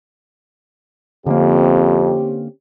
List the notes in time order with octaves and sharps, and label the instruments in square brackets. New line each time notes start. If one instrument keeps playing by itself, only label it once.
[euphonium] F2 [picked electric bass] D3 A#3 [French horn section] C4 C#4 G4